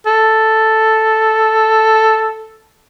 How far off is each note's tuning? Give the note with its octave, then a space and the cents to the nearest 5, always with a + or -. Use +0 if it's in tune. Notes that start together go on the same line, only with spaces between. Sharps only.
A4 +0